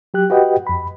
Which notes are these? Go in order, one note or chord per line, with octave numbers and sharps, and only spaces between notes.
F#3 G4 F#6
F#4 G4 B4 D#5 F#5 G5
F2 B5